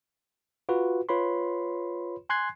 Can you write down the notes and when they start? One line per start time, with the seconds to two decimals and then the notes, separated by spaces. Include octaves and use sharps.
0.69 F4 F#4 B4
1.09 F4 B4 C#5 B5 C6
2.29 G#5 C6 F#6 G#6 C7